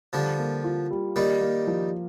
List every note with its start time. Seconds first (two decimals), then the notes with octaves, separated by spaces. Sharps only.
0.13 D3 F3 G3
0.39 A#3
0.64 F4
0.90 G3
1.16 D#3 G3 A#3
1.41 A#3
1.67 F3